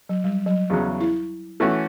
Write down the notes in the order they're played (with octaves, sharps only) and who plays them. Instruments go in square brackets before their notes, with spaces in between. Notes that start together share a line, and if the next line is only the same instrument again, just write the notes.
[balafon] F#3
G3
F#3
[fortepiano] E2 C#3 F#3
[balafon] E4
[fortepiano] E3 A3 C#4 F#4